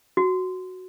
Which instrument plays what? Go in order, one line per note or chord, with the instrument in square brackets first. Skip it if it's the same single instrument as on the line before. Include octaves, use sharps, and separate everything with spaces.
[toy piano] F#4